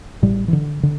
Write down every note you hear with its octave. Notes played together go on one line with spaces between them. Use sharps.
A1 A2 G3
E3
D3
D3